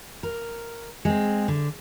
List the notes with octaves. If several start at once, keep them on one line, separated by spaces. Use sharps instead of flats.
A#4
G#3 C4
D3